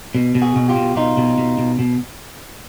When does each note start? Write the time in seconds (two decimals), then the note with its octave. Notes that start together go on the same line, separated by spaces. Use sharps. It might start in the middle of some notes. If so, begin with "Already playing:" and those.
0.15 B2
0.35 B2
0.42 F#4 G#4
0.56 B2
0.69 F4 G4
0.76 B2
0.96 B2 D#4 F4
1.17 B2
1.38 B2
1.58 B2
1.79 B2